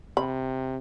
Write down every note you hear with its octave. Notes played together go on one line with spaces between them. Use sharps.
C3 B5